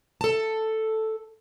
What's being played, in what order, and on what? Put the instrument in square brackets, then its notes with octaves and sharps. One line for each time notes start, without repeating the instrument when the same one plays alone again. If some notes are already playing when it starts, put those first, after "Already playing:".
[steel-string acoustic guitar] A4 A5